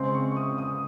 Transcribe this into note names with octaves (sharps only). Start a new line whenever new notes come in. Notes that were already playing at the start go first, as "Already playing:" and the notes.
Already playing: C#3 G#3 C4 C6
C#6
C#6
D#6
D#6